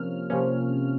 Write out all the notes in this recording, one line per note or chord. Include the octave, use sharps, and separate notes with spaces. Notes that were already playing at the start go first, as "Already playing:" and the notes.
Already playing: C3 F3 A#3 C#4 F6
C3 F3 A#3 C#4